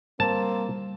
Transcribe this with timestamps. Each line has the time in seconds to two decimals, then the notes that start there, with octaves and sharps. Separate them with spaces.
0.20 G3 A#3 C4 A5